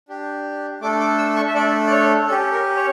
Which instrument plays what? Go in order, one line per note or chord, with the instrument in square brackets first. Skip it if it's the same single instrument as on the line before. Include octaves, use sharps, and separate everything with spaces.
[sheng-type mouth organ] D4 G4
A3 D4 A4 D6
D6
E6
C#6
E5
A3 D4 A4 D5
D5
C#5
C#4 G4 A4
A#4
C#5